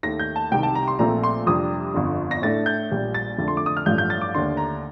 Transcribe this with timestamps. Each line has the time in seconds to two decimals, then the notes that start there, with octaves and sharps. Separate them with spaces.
0.03 D#2 D#3 A3 A#6
0.19 G6
0.36 A5
0.51 C2 C3 D#3 G5
0.63 A5
0.75 A#5
0.88 C6
0.99 A#1 A#2 F3 A3 C4 A#5
1.23 C6
1.46 F2 C3 G3 D4 D#6
1.94 G1 F2 D3
2.31 A#6
2.42 A2 A3 D4 A6
2.66 G6
2.91 A#1 A#2 G3
3.14 A6
3.38 F2 D3 A3 D4
3.48 C6
3.57 D6
3.66 D#6
3.77 F6
3.85 A1 G2 F3 A3 G6
3.98 G6
4.10 A6
4.21 D6
4.34 D#2 D3 A3 D4 C6
4.57 A#5